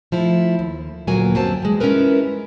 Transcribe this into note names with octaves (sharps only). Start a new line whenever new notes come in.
F3 A3 E4
D#2
D2 A#2 F#3 A#3 B3 G#5
F#2 F#3 A#3 C4 G4 A5
E3 G#3
G#3 C#4 E4 F4 A#4 B4